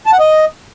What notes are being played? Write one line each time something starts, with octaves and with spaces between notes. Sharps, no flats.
A5
F#5
D#5